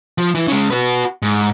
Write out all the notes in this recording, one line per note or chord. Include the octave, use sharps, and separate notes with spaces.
F3
E3
C#3 G#3
F#4 B4
G#2